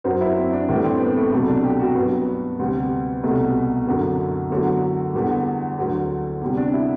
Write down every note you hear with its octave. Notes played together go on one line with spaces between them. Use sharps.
F#2 F#3 C5
E4
C4
D4
A2 E3 G3 D4
C4
B3
A3
C2 B2 F#3 A3
D4
G4
F#4
G2 F#3 B3
D2 C3 G3
C2 B2 G3 A3
F#2 D3 F#3
E2 D3 F#3 A3
E2 D3 G3
D2 D3 F#3
E2 C3 G3
D4
E4